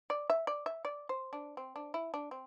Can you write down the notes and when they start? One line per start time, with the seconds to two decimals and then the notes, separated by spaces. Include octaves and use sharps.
0.10 D5
0.30 E5
0.47 D5
0.66 E5
0.85 D5
1.09 C5
1.33 D4
1.57 C4
1.76 D4
1.94 E4
2.14 D4
2.31 C4